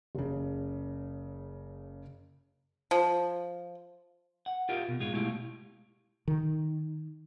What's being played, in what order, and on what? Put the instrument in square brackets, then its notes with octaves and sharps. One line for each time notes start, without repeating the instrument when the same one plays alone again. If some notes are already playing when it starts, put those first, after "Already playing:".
[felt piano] F#1 C#3
[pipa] F3
[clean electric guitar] F#5
F4 G4 A#4 F5
B2
G#2 G#3 F4
B2 G#3 A3 E4 G4 F5
[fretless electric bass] D#3